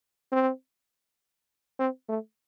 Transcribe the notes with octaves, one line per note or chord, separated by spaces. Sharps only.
C4
C4
A3